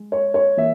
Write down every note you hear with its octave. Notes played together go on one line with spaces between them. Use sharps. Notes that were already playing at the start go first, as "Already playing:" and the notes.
Already playing: G#3
C#5
C#5
E3 A#3 E5